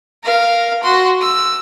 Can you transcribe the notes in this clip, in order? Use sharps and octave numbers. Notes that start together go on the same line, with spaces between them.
A#4 F5
F#4 C6
E6